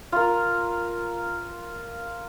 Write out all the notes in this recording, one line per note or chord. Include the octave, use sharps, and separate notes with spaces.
F4 A#4